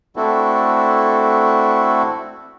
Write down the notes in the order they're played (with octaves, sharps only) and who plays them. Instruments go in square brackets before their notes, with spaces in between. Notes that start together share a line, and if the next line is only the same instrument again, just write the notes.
[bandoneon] A3 C4 D4 E4 F#4 A4